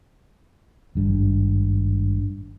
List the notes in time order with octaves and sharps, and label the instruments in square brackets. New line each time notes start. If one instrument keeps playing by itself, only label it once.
[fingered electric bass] G#1 G2